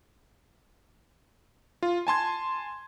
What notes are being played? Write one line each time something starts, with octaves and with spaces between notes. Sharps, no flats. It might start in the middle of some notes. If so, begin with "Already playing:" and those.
F4
G#5 A5 C6 G#6